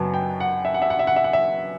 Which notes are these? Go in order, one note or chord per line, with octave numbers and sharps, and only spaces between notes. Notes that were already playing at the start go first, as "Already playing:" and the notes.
Already playing: F#1 F#2 F#3 B3 A5
G5
F#5
E5
F#5
E5
F#5
E5
F#5
E5
F#5
E5